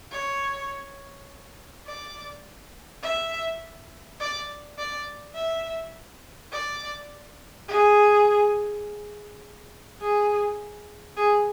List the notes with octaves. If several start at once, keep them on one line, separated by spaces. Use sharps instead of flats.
C#5
D5
E5
D5
D5
E5
D5
G#4
G#4
G#4